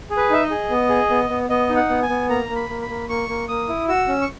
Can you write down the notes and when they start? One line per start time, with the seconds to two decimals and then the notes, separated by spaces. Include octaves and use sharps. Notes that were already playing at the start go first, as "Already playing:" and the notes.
0.10 G#4
0.17 B4
0.30 D#4 E5
0.43 D#5
0.50 G#4
0.70 B3
0.89 G#4
1.10 B3
1.30 B3
1.49 B3 D#5
1.69 D#4
1.76 F#5
1.89 B3
2.02 G#5
2.09 B3
2.29 A#3 A#5
2.49 A#3
2.56 B5
2.69 A#3
2.82 B5
2.89 A#3
3.09 A#3 C#6
3.29 A#3
3.48 A#3 D#6
3.69 E4
3.88 F#4 E6
4.08 C#4
4.21 C#6